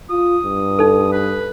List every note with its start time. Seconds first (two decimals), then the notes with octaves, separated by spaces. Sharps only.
0.10 F4 D#6
0.44 G2
0.79 D#4 A4
1.12 B4